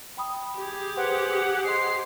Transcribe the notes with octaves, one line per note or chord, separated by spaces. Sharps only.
G5 B5 D#6
G4 G#4
B4 C5 F#5 C6
C5 D#5 C6 C7